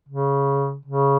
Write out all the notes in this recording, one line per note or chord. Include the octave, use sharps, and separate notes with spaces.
C#3
C#3